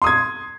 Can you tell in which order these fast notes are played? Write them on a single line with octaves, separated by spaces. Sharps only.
C6 D#6 G#6